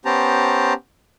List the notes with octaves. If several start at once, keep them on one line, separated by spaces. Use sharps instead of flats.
B3 C#4 G4 C5 A5 A#5